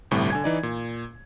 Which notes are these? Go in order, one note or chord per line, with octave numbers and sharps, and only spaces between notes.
G1 A2 C3 G3
D3 G#5 G#6
E3 D#4 D5
A#2